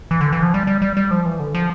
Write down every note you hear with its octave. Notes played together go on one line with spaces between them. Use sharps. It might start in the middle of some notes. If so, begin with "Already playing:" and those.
E3
D3
E3
F3
G3
G3
G3
G3
F3
E3
D3
F3